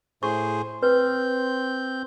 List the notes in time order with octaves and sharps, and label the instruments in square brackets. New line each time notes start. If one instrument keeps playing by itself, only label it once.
[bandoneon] A2 G#4 C5 [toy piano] C#6
[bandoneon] C4 G6 [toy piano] B4